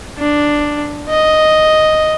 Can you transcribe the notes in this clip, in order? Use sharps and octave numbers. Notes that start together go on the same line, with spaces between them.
D4
D#5